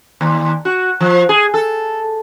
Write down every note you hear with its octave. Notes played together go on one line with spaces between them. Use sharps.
D#2
F#4
F3
G#4
A4